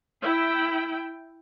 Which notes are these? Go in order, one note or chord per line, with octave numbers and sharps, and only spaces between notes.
E4 G5